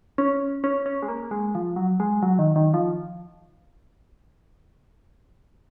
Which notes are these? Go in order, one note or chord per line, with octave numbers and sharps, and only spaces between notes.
C#4
C#4
C#4
G#3
A#3
G#3
F3
F#3
G#3
F#3
D#3
D#3
F3